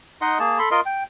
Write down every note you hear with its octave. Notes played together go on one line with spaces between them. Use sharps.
D#4 D#5 F#5 C6
A#3 G#4 A5
A4 B5 C6
F4 A#4 D#5 C6
G5